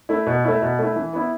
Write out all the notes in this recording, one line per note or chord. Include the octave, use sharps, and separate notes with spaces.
A3 E4
B2
A3 E4
B2
A3 E4
E3
B3 E4